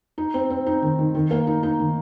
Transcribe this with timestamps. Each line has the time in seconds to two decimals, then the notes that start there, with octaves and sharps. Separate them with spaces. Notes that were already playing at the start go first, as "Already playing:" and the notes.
0.18 D#4
0.34 C4
0.50 C4
0.66 D#4
0.82 D#3
0.99 D#3
1.14 D#3
1.31 A#3
1.47 D#4
1.63 D#4
1.79 D#3